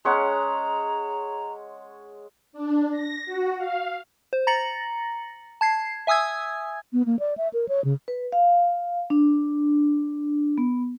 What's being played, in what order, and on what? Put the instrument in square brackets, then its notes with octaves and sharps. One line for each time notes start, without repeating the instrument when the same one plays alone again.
[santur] G#3 C#4 F#5 [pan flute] A#5
[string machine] D4
A#6
F#4
F5
[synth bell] C5
A#5 A6 A#6 C#7 F#7
A5 G#6 C7
E5 G#5 D#6 E6 G#6
[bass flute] B3
A#3
D5
E5
A#4
C#5
C#3
[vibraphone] B4
F5
D4
B3